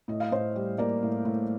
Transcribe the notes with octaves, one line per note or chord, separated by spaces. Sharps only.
A2 D#5
F5
A2 C5 D#5
G3
A#3 A#4 D5
A2
A2